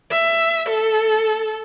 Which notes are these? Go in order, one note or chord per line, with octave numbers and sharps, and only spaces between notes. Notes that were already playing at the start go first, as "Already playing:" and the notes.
E5
A4